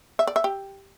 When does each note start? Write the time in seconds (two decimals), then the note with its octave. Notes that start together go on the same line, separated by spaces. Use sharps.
0.19 E5
0.27 D5
0.36 E5
0.44 G4